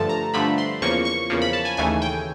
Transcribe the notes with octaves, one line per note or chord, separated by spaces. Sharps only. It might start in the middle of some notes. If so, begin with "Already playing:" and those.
Already playing: G2 D3 F3 A3 A5
A#5
G2 D3 F3 A3 B5
C6
E2 C#3 F3 A#3 C#6
C#6
E2 C#3 F3 A#3
B5
A5
G#5
D#2 C#3 E3 A3 G#5
G5